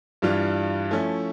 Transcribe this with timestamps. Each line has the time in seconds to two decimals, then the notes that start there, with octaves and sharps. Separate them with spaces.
0.22 G2 E3 G3 D4 F4
0.91 F3 A3 C#4 E4